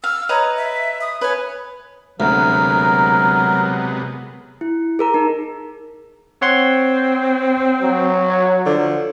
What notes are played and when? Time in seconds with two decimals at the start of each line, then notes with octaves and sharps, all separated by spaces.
0.04 F5 E6
0.29 B4 C#5 D#5 A#5
0.57 E5
1.01 D#6
1.21 B4 C#5 G#5
2.20 D2 C3 F#3 G#3 B3 A#4
4.61 E4
4.99 G#4 A#4 A#5
5.14 D#4
6.42 C4 C#5 F#5 C6
7.82 F#3
8.30 C#5
8.66 D3 F3